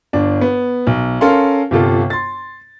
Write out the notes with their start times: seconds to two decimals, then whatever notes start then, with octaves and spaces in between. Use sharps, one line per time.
0.13 G1 D4
0.41 B3
0.87 B1
1.21 C#4 A4 A#4 F5 C6
1.71 G1 C3 F4 A4
2.10 C6 A6